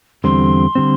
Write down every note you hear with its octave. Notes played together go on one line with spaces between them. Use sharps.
E2 D3 G3 C4 C6
D3 G3 C4